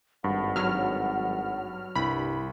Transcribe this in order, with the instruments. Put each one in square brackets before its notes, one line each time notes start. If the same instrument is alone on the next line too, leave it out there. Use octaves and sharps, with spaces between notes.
[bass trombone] G#1 [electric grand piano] G2 [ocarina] F#5
[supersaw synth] F#3 F6
[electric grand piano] C2 [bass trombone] G2 [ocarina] E4 [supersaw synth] B5